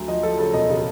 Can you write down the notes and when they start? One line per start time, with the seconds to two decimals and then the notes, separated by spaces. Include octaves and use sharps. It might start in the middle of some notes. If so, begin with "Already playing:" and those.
Already playing: D2 F#3
0.08 F3 D#5
0.23 F3 A4
0.39 C#3 A4
0.53 E1 D#5
0.69 C#3